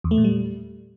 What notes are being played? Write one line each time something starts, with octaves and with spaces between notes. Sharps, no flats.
E2
A3
A#2
G3